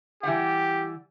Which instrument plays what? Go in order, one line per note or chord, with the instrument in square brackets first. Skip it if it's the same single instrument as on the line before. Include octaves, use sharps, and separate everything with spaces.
[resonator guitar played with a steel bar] E3 G3 F#5 [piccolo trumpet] G4